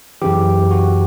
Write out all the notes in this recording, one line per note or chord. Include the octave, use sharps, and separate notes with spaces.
F#2 C#3 E3 G4
F#4